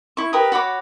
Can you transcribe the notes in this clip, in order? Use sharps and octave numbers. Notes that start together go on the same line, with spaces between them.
E4 C#6
G4 A#4 B4 D#6
F#4 C#5 B5 D6